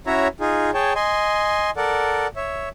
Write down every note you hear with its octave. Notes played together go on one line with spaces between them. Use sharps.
C#4 E4 F#4 C#5 E5 A#5
D#4 F4 G#4
G#4 C#5 G5 A5
D#5 G#5 C6
A4 A#4 D5 F#5
C#5 E5